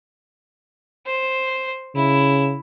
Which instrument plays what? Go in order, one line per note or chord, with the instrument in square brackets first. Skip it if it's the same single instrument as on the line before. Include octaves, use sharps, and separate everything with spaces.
[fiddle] C5
[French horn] C#3 [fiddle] E4